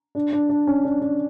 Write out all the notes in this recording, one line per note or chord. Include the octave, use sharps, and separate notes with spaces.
D4
D4
D4
C#4
D4
D4